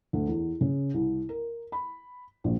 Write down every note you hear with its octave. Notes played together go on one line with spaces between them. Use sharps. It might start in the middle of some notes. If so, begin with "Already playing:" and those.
D2
E2
C#3
C2
A#4
B5
A#1